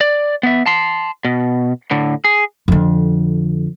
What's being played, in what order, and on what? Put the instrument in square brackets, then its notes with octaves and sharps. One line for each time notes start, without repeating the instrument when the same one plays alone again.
[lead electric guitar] D5
B3 E5
A5 C6
B2
A2 D3
G#4
[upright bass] F2 D3